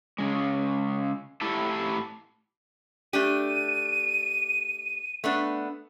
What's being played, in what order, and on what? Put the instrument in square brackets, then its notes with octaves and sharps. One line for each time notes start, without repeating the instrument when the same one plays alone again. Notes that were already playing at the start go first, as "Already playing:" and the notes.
[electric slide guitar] C#3 G#3
A2 E4 G4 A4 A5
[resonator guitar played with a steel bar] A3 D4 G4 [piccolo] D#7
[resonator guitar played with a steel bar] A3 B3 D4